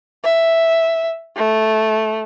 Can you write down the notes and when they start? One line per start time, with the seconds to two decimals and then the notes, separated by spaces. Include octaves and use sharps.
0.24 E5
1.37 A3